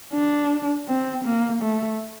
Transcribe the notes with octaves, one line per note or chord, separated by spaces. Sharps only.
D4
C4
A#3
A3